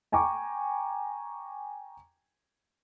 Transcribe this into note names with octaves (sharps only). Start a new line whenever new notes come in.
G5 G#5 A#5 C#6 D6